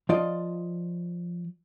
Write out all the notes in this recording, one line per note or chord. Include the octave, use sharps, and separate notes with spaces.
F3 F4 D5 D#5